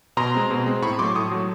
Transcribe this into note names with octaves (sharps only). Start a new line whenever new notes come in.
B2 A#5 C6
G#3 C4
B2
G#3 C4
A2 B5 C#6
F#3 A3 C6 D6
A2 C#6 D#6
F#3 A3